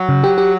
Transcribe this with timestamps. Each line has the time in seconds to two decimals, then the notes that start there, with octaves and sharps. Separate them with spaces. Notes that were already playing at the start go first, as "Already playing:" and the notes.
Already playing: F#3
0.09 C#3
0.24 G4
0.38 G4